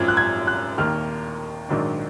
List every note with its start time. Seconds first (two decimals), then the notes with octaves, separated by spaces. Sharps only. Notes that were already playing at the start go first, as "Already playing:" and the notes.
Already playing: G#1 F#2 F3 G#6
0.08 F#6
0.17 G#6
0.47 F#6
0.78 D#2 D#3 A#3 F6
1.69 A#1 G#2 D#3 F#3 D4